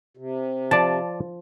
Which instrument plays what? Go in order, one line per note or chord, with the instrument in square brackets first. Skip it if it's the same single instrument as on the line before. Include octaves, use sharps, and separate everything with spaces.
[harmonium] C3
[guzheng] F3 [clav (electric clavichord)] D5 A5